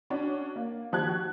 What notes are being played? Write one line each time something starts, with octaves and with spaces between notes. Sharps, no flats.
C#4 D4 F#4
A#3
D#3 F3 G4 A5 F#6 G#6
F#4